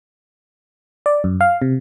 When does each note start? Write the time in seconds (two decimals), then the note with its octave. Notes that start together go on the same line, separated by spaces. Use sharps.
1.06 D5
1.24 F#2
1.41 F5
1.62 C3